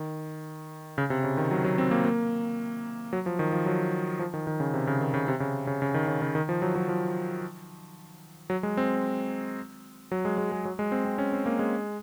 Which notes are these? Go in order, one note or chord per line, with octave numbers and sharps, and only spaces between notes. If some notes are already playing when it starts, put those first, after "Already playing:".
Already playing: D#3
C#3
C3
C#3
D#3
F#3
F#3
C4
A#3
A#3
F#3
F3
D#3
F3
F#3
F3
D#3
D#3
C#3
C3
C#3
D#3
C#3
C3
C#3
C#3
C#3
D#3
C#3
C#3
D#3
F3
F#3
F#3
F3
F#3
G#3
C4
F#3
G#3
G#3
G#3
F#3
G#3
C4
C4
C#4
C4
A#3
G#3